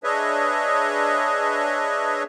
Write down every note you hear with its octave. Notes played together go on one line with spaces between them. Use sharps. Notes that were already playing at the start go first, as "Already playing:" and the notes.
D4 G#4 B4 C#5 D#5 E5